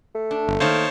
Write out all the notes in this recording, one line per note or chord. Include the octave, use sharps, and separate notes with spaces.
A3
D4
G1
D#3 A#3 C5 C#5 A5